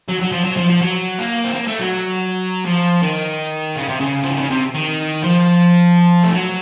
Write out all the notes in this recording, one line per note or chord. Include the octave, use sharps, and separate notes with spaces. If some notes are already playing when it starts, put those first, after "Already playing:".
F#3
F#3
F3
F#3
F3
F3
F#3
A#3
C4
A#3
A3
F#3
F3
D#3
C#3
C3
C#3
F3
D#3
C#3
C3
D#3
F3
A3
F#3